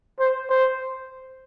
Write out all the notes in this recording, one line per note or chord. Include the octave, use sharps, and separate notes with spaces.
C5
C5